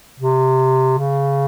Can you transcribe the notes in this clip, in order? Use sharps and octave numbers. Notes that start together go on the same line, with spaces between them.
C3
C#3